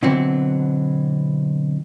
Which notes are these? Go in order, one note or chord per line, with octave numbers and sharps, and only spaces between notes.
B2 D3 E3 F#3 C4